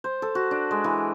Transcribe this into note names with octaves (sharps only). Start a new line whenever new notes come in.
C5
A4
F#4
D4
G#3
E3